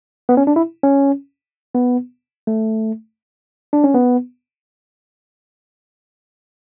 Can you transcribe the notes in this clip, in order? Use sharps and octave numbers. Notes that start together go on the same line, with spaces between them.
B3
C#4
D4
E4
C#4
B3
A3
D4
C#4
B3